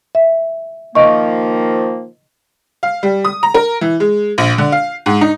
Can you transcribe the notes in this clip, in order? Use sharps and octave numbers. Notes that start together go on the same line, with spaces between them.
E5
D#3 F3 A#3 D#5 C#6
F5
G3
D#6
A#5
A#4
E3
G#3
A#1
D3
F5
G#2
D#4